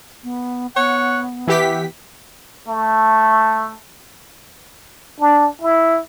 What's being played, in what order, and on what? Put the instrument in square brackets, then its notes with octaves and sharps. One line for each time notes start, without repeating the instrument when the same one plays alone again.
[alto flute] B3
[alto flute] B3 [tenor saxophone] C#5 [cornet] F#5
[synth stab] E3 G4 B6 [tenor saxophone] B3 [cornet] E5
[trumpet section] A3
[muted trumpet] D4
E4